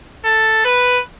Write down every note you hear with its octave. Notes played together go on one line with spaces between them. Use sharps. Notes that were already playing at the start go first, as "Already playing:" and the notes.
A4
B4